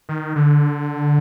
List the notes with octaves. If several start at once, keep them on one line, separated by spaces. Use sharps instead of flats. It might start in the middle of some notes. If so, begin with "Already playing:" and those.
D#3
D3